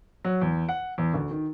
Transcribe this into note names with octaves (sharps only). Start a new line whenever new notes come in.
F#3
E2
F#5
E2
D2
D#3